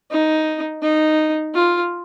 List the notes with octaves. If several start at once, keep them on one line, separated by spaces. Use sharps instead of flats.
D#4
D#4
F4